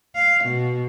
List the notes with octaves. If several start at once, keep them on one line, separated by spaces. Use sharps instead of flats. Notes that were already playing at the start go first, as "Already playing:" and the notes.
F5
B2